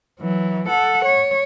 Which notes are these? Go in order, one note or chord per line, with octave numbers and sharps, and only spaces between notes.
E3 F#3
A4 F#5
C#5